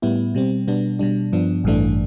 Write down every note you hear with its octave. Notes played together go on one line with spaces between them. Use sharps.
A2 G3 B3 E4
B2 G3 C4
B2 G3 B3 D4
B2 G3 D4
G2 F3 B3 D4
A1 G2 E3 A3 D4